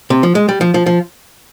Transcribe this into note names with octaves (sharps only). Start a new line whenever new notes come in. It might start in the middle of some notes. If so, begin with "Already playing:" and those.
C3
F3
G#3
G3
F3
F3
F3